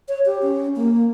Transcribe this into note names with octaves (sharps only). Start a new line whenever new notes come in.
C#5
G4
C#4
A#3